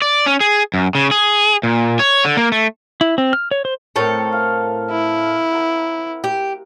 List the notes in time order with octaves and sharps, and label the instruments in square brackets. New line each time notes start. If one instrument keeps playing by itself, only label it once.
[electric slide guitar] D5
C#4
G#4
F#2
C#3
G#4
A#2
C#5
D3
A#3
A3
[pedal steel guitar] E4
C4
F6
C#5
C5
[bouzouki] A2 A4 C#5 [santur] C4 A#4
[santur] F5
[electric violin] E4
[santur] F#5 A#5
[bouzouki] G4